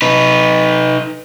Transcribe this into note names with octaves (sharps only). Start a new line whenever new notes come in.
D#4 B4